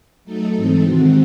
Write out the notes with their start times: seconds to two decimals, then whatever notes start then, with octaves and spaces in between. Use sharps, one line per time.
0.25 F#3 A3 D#4 A4
0.54 G#2 E3 C4 D#4 A4
0.83 C3 D#3 G#3 C4 F#4